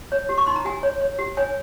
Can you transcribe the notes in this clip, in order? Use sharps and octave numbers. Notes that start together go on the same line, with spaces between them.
C#5
G4
C#6
D#4 C6
A#5
G4 G#5
C#5
C#5
G4
C#5 G#5